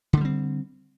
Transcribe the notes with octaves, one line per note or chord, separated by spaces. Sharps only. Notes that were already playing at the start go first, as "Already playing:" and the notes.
D3 G3 A3 C4